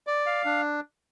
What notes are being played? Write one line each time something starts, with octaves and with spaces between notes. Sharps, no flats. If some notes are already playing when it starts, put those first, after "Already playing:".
D5
F5
D4